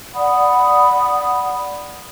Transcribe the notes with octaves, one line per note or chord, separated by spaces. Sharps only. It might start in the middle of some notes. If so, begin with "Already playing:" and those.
D5 F#5 B5 D#6